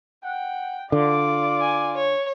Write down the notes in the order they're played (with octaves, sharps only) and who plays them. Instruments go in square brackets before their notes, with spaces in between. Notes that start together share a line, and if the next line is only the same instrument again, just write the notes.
[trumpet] F#5 [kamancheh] G5
[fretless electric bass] D3 [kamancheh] F4 D5 [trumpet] D6
[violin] G#5
C#5